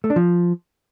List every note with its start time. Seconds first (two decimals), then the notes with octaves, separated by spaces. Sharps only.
0.04 A3
0.10 D4
0.16 F3